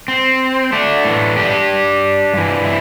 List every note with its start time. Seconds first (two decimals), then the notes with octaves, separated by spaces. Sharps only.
0.08 C4
0.73 A3 D4
1.05 A2 E3
1.37 D4 G4
2.34 G2 E3
2.65 E4